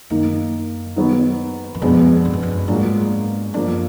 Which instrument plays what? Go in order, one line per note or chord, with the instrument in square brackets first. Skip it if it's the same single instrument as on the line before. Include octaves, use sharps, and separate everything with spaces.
[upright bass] F#2 [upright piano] D#3 A#3 D#4
[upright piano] D#3 F#3 B3
[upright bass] F#2
[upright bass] F2 [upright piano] B2 G#3 B3 D4
[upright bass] G#2
F#2
F2
F#2
[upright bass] G#2 [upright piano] F#3 A#3 D4 F4 G#4
[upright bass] F#2 [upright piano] F3 A#3 D4